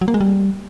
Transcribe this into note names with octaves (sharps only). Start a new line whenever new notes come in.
F#3
A#3
G#3
G3